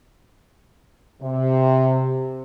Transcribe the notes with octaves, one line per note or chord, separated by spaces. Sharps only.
C3